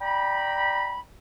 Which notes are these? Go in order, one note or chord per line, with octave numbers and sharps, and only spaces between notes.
D5 G5 A#5 B5